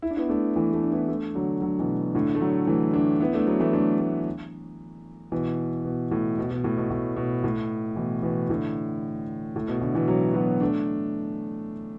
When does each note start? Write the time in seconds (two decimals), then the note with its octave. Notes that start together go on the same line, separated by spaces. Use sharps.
0.02 E4
0.11 D4
0.17 B3 E4
0.29 A3 D4
0.56 E3 A3
0.73 A3 D4
0.84 D4
0.91 B3 E4
1.08 A3 D4
1.35 D3 F#3
1.62 D3 F#3
1.79 B2 E3
2.15 A2 D3
2.35 A3
2.41 D3 F#3
2.67 E3 A3
2.93 A3 D4
3.20 B3 E4
3.34 A3 D4
3.47 F#3 B3
3.60 E3 A3
3.73 A3 D4
4.00 A3 D4
5.32 B2 E3
5.85 B2
6.11 A2
6.38 B2
6.51 B2
6.64 A2
6.77 B2
6.90 A2
7.17 B2
7.44 A2
7.96 B2 E3
8.23 B2 E3
8.49 A2 D3
9.56 A2
9.68 B2
9.81 A2 D3
9.94 B2 E3
10.07 D3 F#3
10.34 F#3 B3
10.60 A3 D4